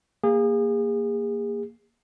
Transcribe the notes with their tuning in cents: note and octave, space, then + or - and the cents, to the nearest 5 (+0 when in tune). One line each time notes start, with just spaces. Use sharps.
A#3 +0 G#4 -30